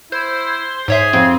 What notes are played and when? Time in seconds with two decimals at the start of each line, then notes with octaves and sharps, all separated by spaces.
0.12 E4 C5
0.88 G#2 G#4 C#5 E5
1.13 F2 C4